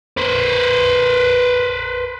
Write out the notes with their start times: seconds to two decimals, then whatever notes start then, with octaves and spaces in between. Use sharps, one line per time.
0.17 B4 C5